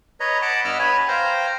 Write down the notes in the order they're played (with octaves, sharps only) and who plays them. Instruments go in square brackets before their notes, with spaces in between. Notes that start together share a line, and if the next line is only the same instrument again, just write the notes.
[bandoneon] B4 C#5 D#5 A#5
F#5 A5 B5 D6 F#6
G2 B3 D#5 E6 F6
B4 C#5 G#5 B5
C5 F5 G5 A#5